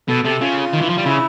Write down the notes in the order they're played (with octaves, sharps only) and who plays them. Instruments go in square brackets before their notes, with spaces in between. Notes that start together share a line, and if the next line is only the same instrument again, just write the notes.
[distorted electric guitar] B2 [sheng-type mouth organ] A4
[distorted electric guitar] C3 [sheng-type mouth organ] A4
[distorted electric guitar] C#3 [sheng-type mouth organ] F4
[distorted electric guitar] D#3
E3
F3
G3
[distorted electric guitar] C#3 [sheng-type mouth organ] E4